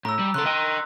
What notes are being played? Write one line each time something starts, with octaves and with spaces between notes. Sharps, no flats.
A2 A#5 E6
G3
C#3 A4 A#5 C6 F#6
D#5 G5